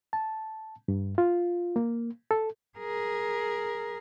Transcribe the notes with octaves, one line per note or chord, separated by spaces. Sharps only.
A5
G2
F4
A#3
A4
G#4 A#4